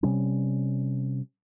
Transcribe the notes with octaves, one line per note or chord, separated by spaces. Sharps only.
C3 G3 C#4